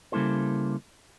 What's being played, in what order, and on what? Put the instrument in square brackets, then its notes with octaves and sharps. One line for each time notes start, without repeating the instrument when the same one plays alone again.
[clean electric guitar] C#3 G3 A#3 E4 A4 C5